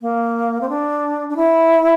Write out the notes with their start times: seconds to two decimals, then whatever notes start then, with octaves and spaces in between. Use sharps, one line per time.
0.01 A#3
0.61 C4
0.69 D4
1.29 D4
1.36 E4